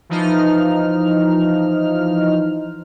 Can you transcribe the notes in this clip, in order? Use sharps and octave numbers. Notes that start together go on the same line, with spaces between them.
E3 F3 D#4 F6